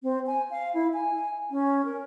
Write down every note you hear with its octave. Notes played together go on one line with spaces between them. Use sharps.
C4
G#5
F5
E4
G#5
C#4
A#4